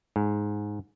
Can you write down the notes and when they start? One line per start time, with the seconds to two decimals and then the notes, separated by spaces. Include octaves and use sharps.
0.16 G#2